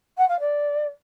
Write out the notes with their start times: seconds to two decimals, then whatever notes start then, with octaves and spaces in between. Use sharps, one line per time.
0.18 F#5
0.29 F5
0.40 D5